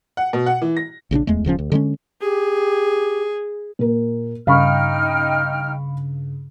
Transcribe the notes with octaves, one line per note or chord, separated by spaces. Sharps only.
F#5
B2
F#5
E3
A#6
A#1 C#3 C#4 D4
D1 E2 G#3 A3
D#1 C#3 F3 C#4
D2
D3 G3 G#3 C#4
G4 G#4
A#2 A#4
G2 C#3 D#4 F5 G5 B5 C#6 F6